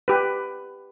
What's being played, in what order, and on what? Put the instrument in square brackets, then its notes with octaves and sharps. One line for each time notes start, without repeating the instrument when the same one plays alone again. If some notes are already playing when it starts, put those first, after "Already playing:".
[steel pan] G4 B4